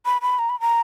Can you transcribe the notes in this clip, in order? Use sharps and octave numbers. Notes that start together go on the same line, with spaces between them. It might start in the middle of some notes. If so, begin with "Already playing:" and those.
B5
B5
A#5
B5
A#5